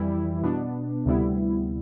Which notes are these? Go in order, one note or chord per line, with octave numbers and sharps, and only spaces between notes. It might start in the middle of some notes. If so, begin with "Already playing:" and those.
Already playing: F2 E3 G3 E4
B2 B3 D4
D2 C3 G3 B3 E4